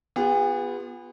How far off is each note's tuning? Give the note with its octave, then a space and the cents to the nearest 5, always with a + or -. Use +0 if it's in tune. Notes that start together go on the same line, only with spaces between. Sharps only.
B3 +0 F4 +10 G#4 -45